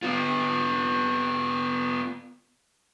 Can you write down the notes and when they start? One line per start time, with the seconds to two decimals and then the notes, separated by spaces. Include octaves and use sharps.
0.03 B3 F4